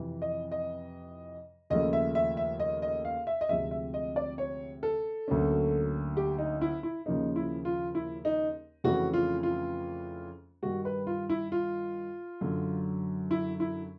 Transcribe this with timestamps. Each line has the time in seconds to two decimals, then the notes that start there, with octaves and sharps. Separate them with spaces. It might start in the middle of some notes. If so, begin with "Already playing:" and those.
Already playing: F2 C3 E3
0.22 D#5
0.52 D#5
1.70 D#2 C#3 F3 A3 D#5
1.93 E5
2.15 E5
2.37 E5
2.60 D#5
2.82 D#5
3.05 F5
3.27 E5
3.41 D#5
3.49 D2 C3 F3 G#3 C4 E5
3.71 E5
3.94 D#5
4.16 D5
4.38 C#5
4.83 A4
5.28 D2 D3 F#3 A#3 C#4
6.17 G4
6.38 D#4
6.61 E4
6.83 E4
7.06 D#2 C#3 F3 A#3 C#4 D#4
7.36 E4
7.65 F4
7.95 E4
8.25 D#4
8.84 F2 C#3 E3 A3 C#4 F#4
9.13 F4
9.43 F4
10.62 G2 D#3 G3 F#4
10.85 B4
11.07 F4
11.30 E4
11.52 F4
12.41 F#2 D3 F#3
13.31 E4
13.60 E4